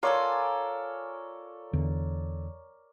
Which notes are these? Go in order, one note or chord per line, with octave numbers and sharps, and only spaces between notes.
F4 A4 A#4 C#5 D5 G#5
E2 D3